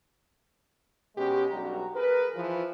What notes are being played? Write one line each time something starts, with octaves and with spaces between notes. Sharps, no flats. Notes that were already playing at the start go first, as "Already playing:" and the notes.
B2 G#3 C#4 G4
B1 G2 G3 F#4 A#5
G#4 A#4 B4
E3 F3